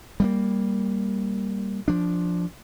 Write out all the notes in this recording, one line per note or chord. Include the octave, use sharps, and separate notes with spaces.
G3 A3 A#3
F3 D4